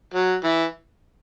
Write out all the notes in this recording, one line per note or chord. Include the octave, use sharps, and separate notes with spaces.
F#3
E3